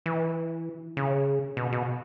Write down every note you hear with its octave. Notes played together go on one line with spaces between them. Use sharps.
E3
C#3
B2
B2